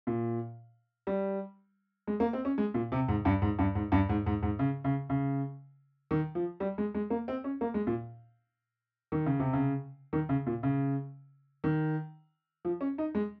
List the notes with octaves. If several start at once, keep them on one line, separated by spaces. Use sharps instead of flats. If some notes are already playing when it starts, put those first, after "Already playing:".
A#2
G3
G#3
A#3
C4
C#4
G#3
A#2
C3
G#2
G2
G#2
G2
G#2
G2
G#2
G#2
G#2
C#3
C#3
C#3
D#3
F3
G3
G#3
G#3
A#3
C4
C#4
A#3
G#3
A#2
D#3
C#3
C3
C#3
D#3
C#3
A#2
C#3
D#3
F3
C#4
D#4
G#3